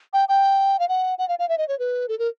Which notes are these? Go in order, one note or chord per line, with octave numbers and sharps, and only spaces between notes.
G5
G5
F5
F#5
F#5
F5
F5
E5
D#5
C#5
B4
A4
A#4